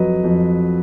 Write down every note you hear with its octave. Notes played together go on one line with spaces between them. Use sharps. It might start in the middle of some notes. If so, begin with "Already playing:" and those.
Already playing: F2 F#3 B4 D#5
F2